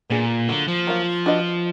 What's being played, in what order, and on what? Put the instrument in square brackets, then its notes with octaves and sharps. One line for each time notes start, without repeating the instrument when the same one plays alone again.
[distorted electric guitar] A#2 [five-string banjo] B3 D4 G#4
[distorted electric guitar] D3 [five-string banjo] F#3 A#3 F4
[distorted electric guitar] F3
[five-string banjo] F#3 A#3 F4
D4 F#4 B4 D#5